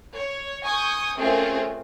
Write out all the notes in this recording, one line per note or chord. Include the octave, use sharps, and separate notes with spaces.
C#5
G#5 C#6 D#6 G6
A3 C4 C#4 F4 G#4 A#4